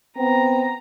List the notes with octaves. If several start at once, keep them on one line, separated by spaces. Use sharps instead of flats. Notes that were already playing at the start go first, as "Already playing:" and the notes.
B3 C4 A#5